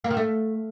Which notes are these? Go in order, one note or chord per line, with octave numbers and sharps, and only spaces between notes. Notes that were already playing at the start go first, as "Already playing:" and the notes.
A#3
D#3
A3